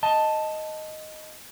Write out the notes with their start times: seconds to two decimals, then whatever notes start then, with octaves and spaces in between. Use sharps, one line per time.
0.03 D#5 A5